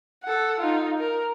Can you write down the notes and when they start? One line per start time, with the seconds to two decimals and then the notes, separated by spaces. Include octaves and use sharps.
0.23 A4 F#5
0.60 D#4 F4
0.98 A#4